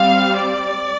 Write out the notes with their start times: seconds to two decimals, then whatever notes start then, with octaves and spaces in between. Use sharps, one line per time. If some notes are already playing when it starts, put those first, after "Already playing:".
Already playing: G3 C4 F5
0.37 D5